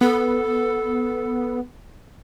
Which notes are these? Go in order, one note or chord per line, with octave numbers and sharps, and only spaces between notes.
B3 A4